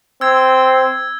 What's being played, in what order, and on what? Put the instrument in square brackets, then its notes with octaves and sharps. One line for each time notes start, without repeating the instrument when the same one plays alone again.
[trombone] C4 [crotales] E6 G#6